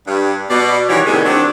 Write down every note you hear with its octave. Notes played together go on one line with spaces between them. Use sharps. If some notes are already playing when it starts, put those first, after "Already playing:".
G2 G3
B2 D5
D#3 E3 F#3 G3 G4 C#5
A2 C3 D#3 G3 B3 G#4
D#3 F#3 C4 D4